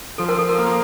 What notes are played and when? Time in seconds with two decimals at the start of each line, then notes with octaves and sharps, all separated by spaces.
0.18 F3 A4
0.29 A#4
0.39 A4
0.49 A#4
0.58 A#3 A4